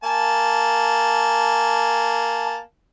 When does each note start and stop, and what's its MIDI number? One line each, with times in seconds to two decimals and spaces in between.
0.04 2.58 58
0.04 2.58 80
0.04 2.58 81